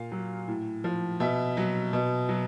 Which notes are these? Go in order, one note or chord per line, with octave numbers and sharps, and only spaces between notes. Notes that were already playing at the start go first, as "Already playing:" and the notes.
Already playing: A#2 F5
F#3
A2
F3
B2 E5
F#3
B2
F#3